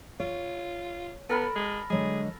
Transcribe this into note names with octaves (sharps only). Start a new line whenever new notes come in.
F4 C#5
B3 A4 A#4 B5
G#3
D3 F#3 G#3 G#4